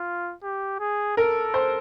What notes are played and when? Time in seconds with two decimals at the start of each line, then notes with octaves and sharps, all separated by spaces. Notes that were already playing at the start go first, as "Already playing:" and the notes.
Already playing: F4
0.43 G4
0.79 G#4
1.17 A4 A#4
1.54 C5